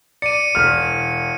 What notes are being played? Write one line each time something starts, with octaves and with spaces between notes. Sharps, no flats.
D5 C#7 D#7
E1 F6